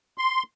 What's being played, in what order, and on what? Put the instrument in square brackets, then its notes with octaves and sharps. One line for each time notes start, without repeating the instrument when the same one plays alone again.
[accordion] C6